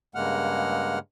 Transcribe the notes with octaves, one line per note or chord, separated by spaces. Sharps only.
G2 C#3 G#3 A#3 F#5 F6